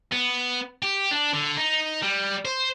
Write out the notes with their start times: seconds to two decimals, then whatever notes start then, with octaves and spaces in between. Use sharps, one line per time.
0.12 B3
0.83 G4
1.11 D4
1.33 D3
1.57 D#4
2.03 G3
2.45 C5